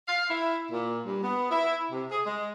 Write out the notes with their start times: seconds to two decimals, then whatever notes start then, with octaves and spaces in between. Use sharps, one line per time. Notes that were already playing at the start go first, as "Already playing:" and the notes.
0.08 F5
0.30 E4
0.72 A#2
1.06 G2
1.23 B3
1.51 E4
1.91 C3
2.11 G#4
2.25 G#3